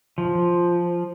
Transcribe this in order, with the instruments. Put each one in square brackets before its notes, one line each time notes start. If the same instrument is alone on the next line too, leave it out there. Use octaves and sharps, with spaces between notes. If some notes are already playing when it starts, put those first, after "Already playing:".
[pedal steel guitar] F3